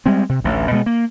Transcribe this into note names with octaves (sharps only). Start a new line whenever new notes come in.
G3 G#3 C4
C3
A1 D2
B2 G#3 A#3 B3
A#3